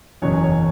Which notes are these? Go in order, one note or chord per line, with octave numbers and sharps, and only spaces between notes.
F#1 E2 B2 F#3 C#4 C#5
C#5